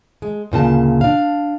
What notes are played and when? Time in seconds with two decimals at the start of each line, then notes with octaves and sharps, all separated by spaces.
0.22 G#3
0.52 D2 A#2 C#3 A5
1.01 D4 F5